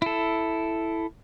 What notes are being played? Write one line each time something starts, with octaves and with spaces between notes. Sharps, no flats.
E4 A4